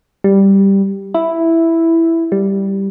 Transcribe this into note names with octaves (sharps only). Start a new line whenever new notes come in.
G3
E4
G3